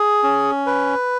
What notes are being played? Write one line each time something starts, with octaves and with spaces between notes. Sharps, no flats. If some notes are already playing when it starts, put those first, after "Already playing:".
Already playing: G#4
C#4
B4